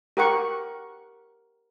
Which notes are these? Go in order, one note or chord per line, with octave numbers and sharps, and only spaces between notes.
G4 A#4 F#5 C#6